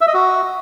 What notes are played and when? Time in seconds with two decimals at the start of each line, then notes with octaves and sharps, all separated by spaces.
0.01 E5
0.08 D#5
0.14 F#4